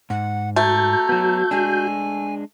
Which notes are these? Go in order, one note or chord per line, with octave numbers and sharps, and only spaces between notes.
G#2 F#5
A3 F#4 A#5 G6
F#3 B3
G#3 D4 G#5